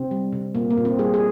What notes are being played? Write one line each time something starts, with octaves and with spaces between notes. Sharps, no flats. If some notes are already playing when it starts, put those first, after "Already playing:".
Already playing: C3 C4
G3
C3
A#2 A#3
A#3
A#2
C4
G3 G#4
G#4